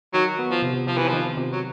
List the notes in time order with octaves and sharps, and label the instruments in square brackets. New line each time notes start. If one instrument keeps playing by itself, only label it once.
[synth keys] D#3 [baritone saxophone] F#3
[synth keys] B3
[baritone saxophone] F3
[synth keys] C3
[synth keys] C3 [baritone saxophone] F3
[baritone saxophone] E3
[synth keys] D#3 [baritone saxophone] F3
[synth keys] C3
[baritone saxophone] F#3